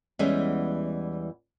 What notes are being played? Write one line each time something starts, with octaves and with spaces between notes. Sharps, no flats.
E2 E3 G3 G#3 B3 C#4